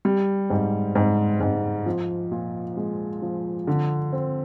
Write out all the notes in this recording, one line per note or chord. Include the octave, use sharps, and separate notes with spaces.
G3
G#2
G#2
G#2
F3
A#2
G#3
F3
D3
C4